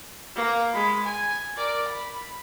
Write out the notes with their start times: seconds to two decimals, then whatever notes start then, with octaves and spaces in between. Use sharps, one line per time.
0.36 A#3
0.73 G#3 B5
1.05 G#5
1.57 A#4 D5
1.88 B5